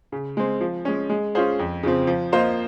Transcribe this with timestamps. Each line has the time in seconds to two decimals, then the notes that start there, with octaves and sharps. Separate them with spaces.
0.12 C#3
0.37 G#3 C4
0.61 F3
0.85 G#3 C#4
1.09 G#3
1.35 C#4 F4 G#4 C5
1.59 F2
1.83 C#3 F3 C4
2.07 F3
2.32 A#3 F4 C5 D#5